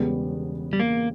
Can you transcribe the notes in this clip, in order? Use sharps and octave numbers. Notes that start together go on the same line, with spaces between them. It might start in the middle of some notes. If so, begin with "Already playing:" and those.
Already playing: E1 E2 C#3 G3 B3
G3
A#3